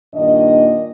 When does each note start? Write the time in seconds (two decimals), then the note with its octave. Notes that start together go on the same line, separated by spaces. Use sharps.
0.14 G2 A#2 D#3 D4 D#5